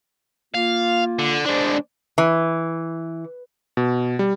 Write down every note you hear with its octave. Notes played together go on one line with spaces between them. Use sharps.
A#3 F4 F5
D3
G#3 D4 C5 D5
E3
B2
G3